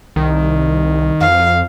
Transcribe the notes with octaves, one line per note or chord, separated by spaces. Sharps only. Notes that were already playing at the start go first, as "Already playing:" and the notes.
C2 D#3
F2 F5